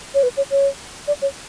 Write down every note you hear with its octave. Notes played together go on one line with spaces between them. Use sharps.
C#5
B4
C#5
C#5
D5
C#5